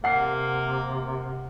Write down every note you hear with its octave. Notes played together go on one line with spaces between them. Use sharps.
C3 A#3 F#5 C7